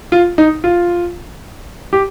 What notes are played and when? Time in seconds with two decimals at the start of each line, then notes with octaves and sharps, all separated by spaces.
0.12 F4
0.38 D#4
0.64 F4
1.93 G4